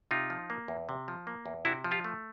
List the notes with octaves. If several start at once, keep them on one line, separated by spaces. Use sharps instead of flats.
C3 D#4 F4
F3
A#3
E2
C3
F3
A#3
E2
C3 E4 F#4
F3
F4 G4
A3